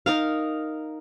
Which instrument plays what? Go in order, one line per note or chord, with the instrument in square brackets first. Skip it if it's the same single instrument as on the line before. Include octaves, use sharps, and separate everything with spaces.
[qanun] D#4 A#4 F5